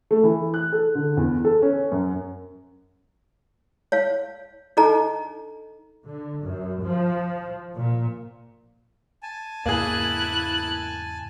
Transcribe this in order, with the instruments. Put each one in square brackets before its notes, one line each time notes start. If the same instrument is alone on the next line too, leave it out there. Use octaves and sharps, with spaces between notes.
[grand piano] A3
E3
F#6
A4
D3
E2
A4
C#4
F#2
[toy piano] C#5 F5
D4 D#4 A4 D#5 A#5
[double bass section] D3
F#2
F3
A#2
[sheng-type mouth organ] G#5 A5
[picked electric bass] E2 G#2 C#3 [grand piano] A#3 G#4 [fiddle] E4 F#6